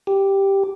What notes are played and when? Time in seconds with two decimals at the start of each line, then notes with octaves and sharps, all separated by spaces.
0.07 G4